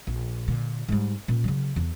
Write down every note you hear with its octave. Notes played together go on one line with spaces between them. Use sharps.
A#1
A#2 D3
G#2 G3
A#2 C#4
C#3 F#3
E2